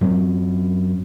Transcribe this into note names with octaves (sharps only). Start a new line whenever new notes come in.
F#2 F#3 C4